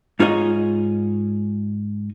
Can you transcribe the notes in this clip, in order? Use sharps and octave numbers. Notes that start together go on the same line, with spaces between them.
G#2 D#4 F4 G#4 C#5 D#5